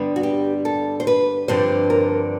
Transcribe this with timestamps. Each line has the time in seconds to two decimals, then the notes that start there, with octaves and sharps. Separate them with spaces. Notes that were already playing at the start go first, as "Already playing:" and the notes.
Already playing: G2 D3 G3 B3 D4
0.16 F#4
0.23 G4
0.65 A4
1.00 C5
1.07 B4
1.48 G2 D3 F3 C4 C5
1.90 A#4